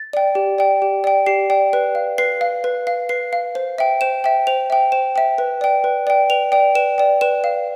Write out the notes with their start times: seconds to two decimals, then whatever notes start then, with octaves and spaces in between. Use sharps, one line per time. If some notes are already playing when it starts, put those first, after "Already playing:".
Already playing: A6
0.13 D5 G5
0.35 G4
0.58 D5 G5
0.82 G4
1.04 D5 G5
1.26 G4 C7
1.50 D5 G5
1.73 B4
1.95 F5
2.18 B4 C7
2.41 F5
2.64 B4
2.87 F5
3.09 B4 C7
3.33 F5
3.55 C5
3.78 E5 G5
4.01 C5 E7
4.24 E5 G5
4.47 C5 F7
4.70 E5 G5
4.92 C5 E7
5.16 E5 G5
5.38 B4
5.61 D5 G5
5.84 B4
6.07 D5 G5
6.30 B4 F7
6.52 D5 G5
6.75 B4 E7
6.98 D5 G5
7.21 B4 E7
7.44 F5